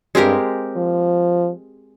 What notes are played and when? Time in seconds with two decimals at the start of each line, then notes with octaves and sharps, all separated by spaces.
0.15 G2 G#3 C4 G4 A#4
0.76 F3